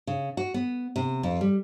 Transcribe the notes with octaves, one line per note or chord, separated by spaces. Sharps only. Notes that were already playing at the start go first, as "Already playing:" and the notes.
C#3
F#4
B3
C3
F2
G3